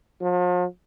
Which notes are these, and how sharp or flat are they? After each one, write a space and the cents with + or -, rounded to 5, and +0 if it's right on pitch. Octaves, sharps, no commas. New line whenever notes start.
F3 +40